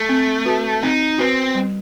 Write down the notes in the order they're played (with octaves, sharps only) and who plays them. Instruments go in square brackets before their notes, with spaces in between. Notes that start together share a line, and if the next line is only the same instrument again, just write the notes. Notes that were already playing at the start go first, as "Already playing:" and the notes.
Already playing: [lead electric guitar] A3
[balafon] C4
F#4 B4
[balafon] C4 [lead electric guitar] D#4
[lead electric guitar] C4 [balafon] F#4 B4
[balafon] G3